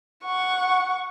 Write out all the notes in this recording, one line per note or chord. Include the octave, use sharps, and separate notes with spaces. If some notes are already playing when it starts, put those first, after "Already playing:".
F#5 C#6